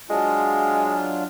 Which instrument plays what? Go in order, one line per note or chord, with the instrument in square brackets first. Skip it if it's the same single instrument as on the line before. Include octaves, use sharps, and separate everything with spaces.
[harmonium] F#3 D4 F4 [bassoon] G#3